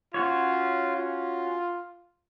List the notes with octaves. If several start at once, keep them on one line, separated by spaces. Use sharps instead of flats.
C#4 F4 F#4 C#5
F4